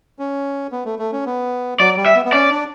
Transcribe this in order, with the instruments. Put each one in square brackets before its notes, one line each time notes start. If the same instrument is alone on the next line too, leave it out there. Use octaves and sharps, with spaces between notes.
[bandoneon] C#4
B3
A3
A3
C#4
B3
[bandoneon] F#3 [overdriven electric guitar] D5
[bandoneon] G3
[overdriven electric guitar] E5
[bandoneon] B3
B3
[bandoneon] C#4 [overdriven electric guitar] D5
[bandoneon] D4